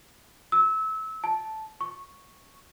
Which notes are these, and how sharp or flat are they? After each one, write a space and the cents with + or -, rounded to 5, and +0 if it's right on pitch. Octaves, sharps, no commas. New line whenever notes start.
E6 -25
A5 -5
C#6 -5